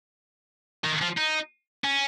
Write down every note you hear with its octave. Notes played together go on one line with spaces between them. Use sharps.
D#3
F3
D#4
C#4